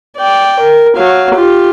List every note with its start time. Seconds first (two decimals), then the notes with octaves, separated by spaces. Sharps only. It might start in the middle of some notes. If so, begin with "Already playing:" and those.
0.18 D5 G5
0.61 A#4
0.96 F#3 F5
1.35 F4 G4